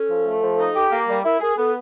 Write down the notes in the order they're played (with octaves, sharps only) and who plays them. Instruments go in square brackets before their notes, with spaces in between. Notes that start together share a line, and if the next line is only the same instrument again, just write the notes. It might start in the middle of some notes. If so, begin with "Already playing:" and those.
Already playing: [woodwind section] C#4 [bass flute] A4
[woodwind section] F3
A3
F3
D#4
G4
A#3
[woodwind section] G3 [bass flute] A#4
[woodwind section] E4 [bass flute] A#4
[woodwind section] G#4 [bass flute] A#4
[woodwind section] B3 [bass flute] A4